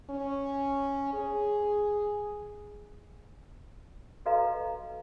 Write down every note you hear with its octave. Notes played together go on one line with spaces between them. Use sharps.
C#4
G#4
F#4 A4 B4 D#5 F5 A#5